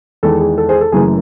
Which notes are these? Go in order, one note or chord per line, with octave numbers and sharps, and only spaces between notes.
E2 D#3 G#3 A4
G#4
A4
G#4 C5
A4
F#1 F#2 E3 A3 G#4